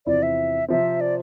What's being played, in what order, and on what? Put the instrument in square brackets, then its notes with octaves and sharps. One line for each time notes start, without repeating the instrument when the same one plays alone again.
[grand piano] E2 C3 F3 C4 E4 [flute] D5
[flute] E5
[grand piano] C3 F3 C4 [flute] E5
[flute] D5